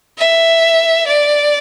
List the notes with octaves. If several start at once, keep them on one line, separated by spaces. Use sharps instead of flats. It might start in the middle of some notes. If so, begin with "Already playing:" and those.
E5
D5